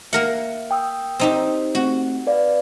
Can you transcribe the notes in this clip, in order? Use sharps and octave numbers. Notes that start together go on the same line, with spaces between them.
A#3 A#4 E5 F#5
G5 D#6 E6
C4 D#4 G4
A3 C4 F#4
B4 D5 F5